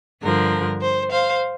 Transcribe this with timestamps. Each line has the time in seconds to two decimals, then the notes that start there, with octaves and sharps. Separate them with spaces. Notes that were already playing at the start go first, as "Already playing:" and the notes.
0.22 G2 D3 F3 A#4
0.81 C5
1.11 C5 F5